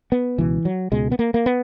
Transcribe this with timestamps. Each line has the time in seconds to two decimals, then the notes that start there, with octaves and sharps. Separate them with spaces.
0.12 B3
0.38 C#2 B2 E3
0.65 F#3
0.92 C#2 B2 G#3
1.12 B3
1.19 A#3
1.34 A#3
1.46 B3